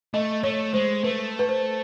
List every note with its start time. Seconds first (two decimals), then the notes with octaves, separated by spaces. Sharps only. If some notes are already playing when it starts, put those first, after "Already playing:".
0.14 A3 D#5
0.43 A3 C#5
0.74 G#3 C5
1.04 A3 B4
1.39 B4
1.49 C5